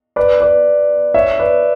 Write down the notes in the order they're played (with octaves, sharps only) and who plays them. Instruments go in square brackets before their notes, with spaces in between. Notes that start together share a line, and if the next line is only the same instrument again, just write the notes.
[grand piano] B4 D5
B4 D5
C#5 E5
B4 D5